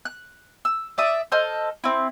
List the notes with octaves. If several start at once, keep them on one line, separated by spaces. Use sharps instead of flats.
F#6
E6
D5 E5 D#6
A4 C5 D#5 F6
C4 E4